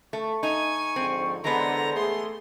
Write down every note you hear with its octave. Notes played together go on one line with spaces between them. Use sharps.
A3 C#6
D#4 G#5
G#2 D3 F3 C4
D3 E3 G#3 B3 C5 A#5
A3 G#4 C6